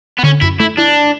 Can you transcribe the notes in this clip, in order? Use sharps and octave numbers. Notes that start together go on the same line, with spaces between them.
B3
D3 C#4
F#2 E4
A3 E4
D4 E4